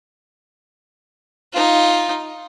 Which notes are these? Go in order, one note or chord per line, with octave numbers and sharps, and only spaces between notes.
D#4 F4